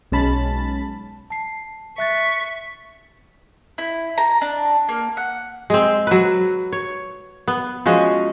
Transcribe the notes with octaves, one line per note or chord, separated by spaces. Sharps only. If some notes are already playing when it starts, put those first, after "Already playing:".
B1 G#3 C#4 A5 B5 A6
A5 C7
E5 C#6 F#6 A6 B6
E4
A#5
D4
A#3
F#5
G#3 C4
F#3 B4
C#5
B3
F3 G#3 C#4 F#4